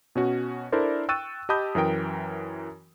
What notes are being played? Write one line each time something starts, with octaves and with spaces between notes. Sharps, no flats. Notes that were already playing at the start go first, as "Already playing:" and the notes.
B2 C#4 F#4
D4 E4 A4 A#4 C5 D5
G5 C#6 E6 F#6 A6 D#7
G4 D#5 A5 B5 D#6 G6
F#2 E3 A#4 G5 D7